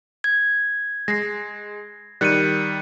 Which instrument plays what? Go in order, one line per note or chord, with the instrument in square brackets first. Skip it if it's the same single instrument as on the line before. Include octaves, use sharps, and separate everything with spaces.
[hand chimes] G#6
[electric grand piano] G#3 [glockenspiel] A#6 C7
[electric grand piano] D#3 G3 [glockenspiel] F#6 C#7 D#7